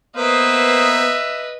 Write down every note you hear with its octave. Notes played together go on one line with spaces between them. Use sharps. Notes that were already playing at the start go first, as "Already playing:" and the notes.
A#3 B3 B4 C5 D#5 E5 D#6